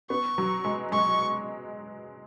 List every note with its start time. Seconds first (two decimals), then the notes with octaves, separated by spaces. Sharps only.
0.10 B3 C#6
0.38 F#3
0.65 G#3
0.92 G#3 C#6